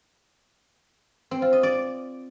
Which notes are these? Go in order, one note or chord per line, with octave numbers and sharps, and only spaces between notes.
C4
F4
D#5
D5